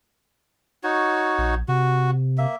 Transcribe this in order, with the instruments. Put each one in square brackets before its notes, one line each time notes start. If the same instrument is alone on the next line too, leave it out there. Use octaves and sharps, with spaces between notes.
[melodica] D#4 F#4 C#5
[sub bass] A#1
[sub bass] C3 [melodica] F#4
[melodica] A#3 E5